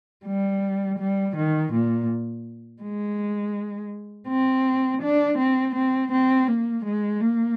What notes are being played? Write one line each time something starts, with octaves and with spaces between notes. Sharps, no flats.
G3
G3
D#3
A#2
G#3
C4
D4
C4
C4
C4
A#3
G#3
A#3